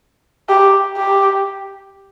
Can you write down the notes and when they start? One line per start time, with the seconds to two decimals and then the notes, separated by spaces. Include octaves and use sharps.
0.49 G4
0.97 G4